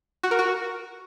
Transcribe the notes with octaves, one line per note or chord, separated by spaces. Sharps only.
F#4
A#4
F#4